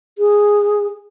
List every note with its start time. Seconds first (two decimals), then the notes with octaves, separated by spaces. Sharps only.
0.18 G#4